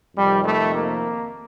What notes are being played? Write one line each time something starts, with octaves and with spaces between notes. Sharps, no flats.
F2 C3 D#3 G3
A3
A#3